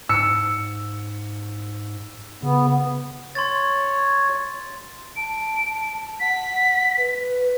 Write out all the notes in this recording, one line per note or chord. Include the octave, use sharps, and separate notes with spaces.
G#2 E6 C#7
C#3 B3
C#5 C6 A6
A5 D7
F#5 B6
B4